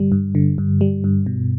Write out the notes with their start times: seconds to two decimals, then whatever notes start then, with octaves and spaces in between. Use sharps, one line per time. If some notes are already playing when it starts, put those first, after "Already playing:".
Already playing: G2 D3 G3
0.12 G2
0.35 D3
0.58 G2
0.81 G3
1.04 G2
1.26 B2